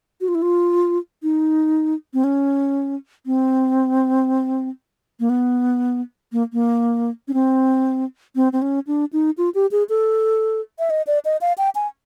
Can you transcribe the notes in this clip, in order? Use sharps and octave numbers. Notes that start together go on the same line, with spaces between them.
F#4
F4
E4
F4
D#4
C4
C#4
C4
A#3
B3
A#3
A#3
C#4
C4
C4
C4
C#4
D4
D#4
F4
G4
G#4
A4
E5
D#5
D5
D#5
F5
G5
G#5